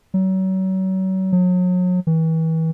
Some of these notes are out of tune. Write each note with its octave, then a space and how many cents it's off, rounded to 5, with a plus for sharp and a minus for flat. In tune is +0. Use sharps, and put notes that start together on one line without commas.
F#3 +35
F#3 -35
E3 -35